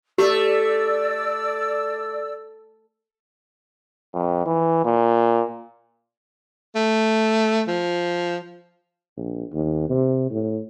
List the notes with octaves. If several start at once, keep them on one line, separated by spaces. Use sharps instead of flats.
A3 G4 D5 E6
F2
E3
A#2
A3
F3
A#1
D#2
C3
A2